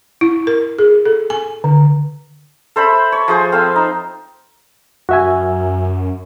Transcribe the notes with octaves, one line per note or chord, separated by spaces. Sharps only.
E4
A#4
G#4
A4
G#5
D3
A4 C5 E5 B5
C#5
F3 G#4 C5
C4 A4 F5
D#4
F#2 F#4 E5 G#5